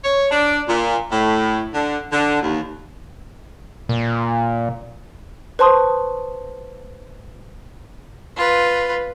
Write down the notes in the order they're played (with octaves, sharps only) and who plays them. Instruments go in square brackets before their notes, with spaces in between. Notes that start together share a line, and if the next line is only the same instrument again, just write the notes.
[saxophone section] C#5
D4
A#2
A2
D3
D3
D#2
[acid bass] A#2
[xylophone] B4 C5 A5 C6 C#6 D#6
[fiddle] F4 B4